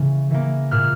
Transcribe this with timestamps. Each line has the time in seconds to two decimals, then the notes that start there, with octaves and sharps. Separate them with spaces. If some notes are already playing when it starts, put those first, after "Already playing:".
Already playing: C#3 E3 A#3
0.31 E3 A#3
0.71 A#2 F6